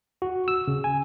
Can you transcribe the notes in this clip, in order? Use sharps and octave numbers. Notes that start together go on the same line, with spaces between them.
F#4
E6
C#3
G#5